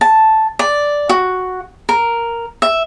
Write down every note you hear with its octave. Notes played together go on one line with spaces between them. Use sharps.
A5
D5
F#4
A#4
E5